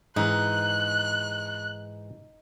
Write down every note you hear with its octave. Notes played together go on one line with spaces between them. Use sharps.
G#2 E3 D#4 F#6